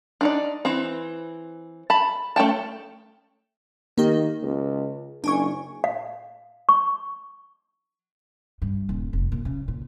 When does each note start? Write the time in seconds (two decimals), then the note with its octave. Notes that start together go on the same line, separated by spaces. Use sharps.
0.21 D4 D#4 D5
0.65 E3 C4
1.90 A5 B5
2.36 A3 C#4 G5 A5
3.98 D#3 A#3 G4
4.43 C#2
5.24 F#1 D4 G#5 C#6
5.84 F5
6.69 C#6
8.62 G2
8.89 D#1
9.13 F1
9.32 A#2
9.45 C#3
9.68 A#2